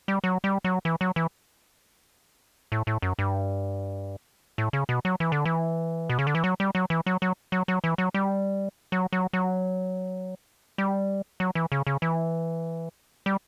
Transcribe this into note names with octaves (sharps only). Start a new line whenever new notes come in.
G3
F#3
G3
F#3
E3
F#3
E3
A2
A2
F#2
G2
A2
C#3
B2
F#3
E3
D3
E3
B2
C#3
D3
E3
F#3
G3
F#3
E3
F#3
F#3
F#3
F#3
E3
F#3
G3
F#3
F#3
F#3
G3
F#3
E3
C#3
C#3
E3
G3